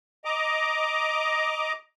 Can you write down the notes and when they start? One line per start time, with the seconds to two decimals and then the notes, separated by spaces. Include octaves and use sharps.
0.25 D#5 A#5 D6